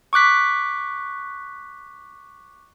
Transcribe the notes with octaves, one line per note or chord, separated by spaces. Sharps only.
C#6 D6 F#6 B6